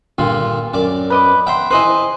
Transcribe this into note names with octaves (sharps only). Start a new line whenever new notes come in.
G2 A#2 D3 F4
F#2 D5
B4 D#5 D6
E5 F#5 G5 C6
E4 G#4 B4 C5 D#5